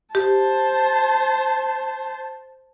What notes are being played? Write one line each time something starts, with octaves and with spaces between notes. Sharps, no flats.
G4 C5 A5